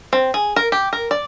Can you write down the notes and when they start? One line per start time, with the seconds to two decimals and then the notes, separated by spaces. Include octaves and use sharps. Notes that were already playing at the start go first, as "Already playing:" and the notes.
0.13 C4
0.34 G#4
0.56 A#4
0.72 G4
0.93 A#4
1.11 D5